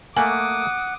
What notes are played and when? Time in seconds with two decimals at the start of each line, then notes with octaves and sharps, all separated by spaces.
0.17 A3 A#3 F#5 G#5 D6 D#6